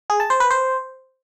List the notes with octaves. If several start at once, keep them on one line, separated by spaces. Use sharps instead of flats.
G#4
A5
C5
B4
C5